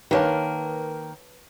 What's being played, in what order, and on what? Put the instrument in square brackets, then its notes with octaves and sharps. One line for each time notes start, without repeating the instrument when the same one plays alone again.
[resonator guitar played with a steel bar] D#3 A#3 [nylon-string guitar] B4 C#5 A5